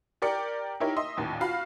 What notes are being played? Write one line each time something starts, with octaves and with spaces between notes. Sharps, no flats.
G4 A#4 D5 G5 C#7
D#4 E4 G4 A#4 C#5
D#5 E5 C6
A1 D#2 A#2
F4 F#4 F5 B5